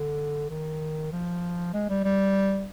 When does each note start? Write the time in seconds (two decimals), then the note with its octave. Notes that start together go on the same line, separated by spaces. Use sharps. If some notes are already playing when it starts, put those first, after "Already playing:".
Already playing: D3
0.50 D#3
1.12 F3
1.74 G#3
1.90 G3
2.04 G3